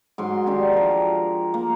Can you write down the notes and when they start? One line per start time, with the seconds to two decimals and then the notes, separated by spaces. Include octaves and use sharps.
0.18 G#2 F#3 C6
0.46 D#3 D4 F#4 G4
0.73 F3 A#4
1.54 A#3